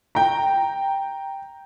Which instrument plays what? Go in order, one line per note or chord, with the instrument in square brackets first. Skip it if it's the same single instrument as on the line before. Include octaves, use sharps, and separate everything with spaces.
[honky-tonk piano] G5 A#5